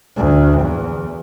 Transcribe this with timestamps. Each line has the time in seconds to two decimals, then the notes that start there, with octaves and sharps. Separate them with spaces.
0.16 D2
0.61 E2